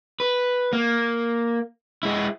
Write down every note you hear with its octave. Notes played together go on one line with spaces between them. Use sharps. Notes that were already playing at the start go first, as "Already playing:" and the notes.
B4
A#3
G#3 E4